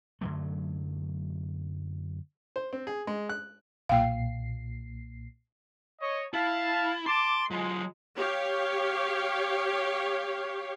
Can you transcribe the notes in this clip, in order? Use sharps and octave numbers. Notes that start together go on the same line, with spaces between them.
F#2 D3 F#3 A3
C5
C4
G#4
G#3
F#6
B1 A#2 F5 G5 C7
C#5 D#5
E4 F5 A5
A5 C6 D6
F#3 G#3 F4
G4 C#5 F5